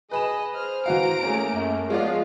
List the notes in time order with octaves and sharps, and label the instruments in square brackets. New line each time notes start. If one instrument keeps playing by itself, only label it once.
[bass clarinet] G#4 [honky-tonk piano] B4 B5 E7 [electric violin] D#5
[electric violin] G#4 F6 [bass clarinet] C5
[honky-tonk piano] E3 F#4 F5 [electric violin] A#5 D7
[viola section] A3 A#3 [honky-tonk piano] C#4 G#4
[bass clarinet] F#2
[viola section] F3 G#4 F5 [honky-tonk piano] G#3 C#5 D5 [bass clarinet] B3 [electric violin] F4